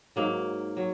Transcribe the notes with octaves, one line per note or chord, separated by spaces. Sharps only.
G#2 F#3 A#3
F#3